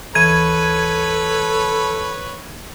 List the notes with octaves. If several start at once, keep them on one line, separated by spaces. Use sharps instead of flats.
D2 E3 A4 B4 C#5 B5 G#6 D#7